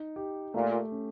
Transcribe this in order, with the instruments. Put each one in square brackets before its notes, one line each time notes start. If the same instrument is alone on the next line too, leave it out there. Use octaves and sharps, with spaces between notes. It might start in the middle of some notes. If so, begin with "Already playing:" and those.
Already playing: [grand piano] D#4
G4
[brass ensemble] A#2 [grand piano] A3
[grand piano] C#4